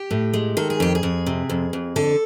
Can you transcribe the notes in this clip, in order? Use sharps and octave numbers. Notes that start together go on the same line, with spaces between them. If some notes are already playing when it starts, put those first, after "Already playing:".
Already playing: G4
A2
G#3
D#3 A4
G#4
F2 G4
G#4
F2
C3
F2
F2
D3 A4